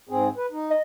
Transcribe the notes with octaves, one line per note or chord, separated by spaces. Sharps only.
G#2 C4 G#4
B4
D#4
D#5